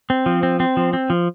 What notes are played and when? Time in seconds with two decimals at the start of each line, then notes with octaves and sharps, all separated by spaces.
0.10 C4
0.26 F3
0.43 C4
0.60 C4
0.77 F3
0.93 C4
1.10 F3